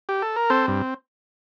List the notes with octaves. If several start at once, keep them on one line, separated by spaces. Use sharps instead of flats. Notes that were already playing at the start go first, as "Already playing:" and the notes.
G4
A4
A#4
C4 A4 C5
G2